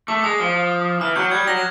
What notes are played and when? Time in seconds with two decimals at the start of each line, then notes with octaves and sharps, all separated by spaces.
0.08 A3 D6
0.24 G#3 D#6
0.40 F3
1.01 E3 F6
1.16 F#3 G6
1.31 G3 G#6
1.47 F#3 A#6